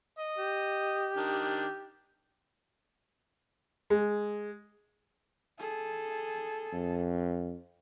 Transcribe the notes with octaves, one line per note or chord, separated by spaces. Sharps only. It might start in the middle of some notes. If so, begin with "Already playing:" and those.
D#5
G4
D#3 D4
G#3
G#4 A4
F2